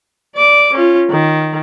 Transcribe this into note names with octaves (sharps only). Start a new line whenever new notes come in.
D5 D6
C#4 F4
D#3